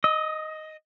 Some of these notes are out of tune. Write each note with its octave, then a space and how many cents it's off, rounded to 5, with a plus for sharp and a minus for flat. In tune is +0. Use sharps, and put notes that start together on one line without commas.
D#5 +0 D#6 +45